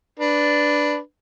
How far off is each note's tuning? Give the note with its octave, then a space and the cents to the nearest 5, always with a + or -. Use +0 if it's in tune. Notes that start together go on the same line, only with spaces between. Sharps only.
D4 +0 B4 +0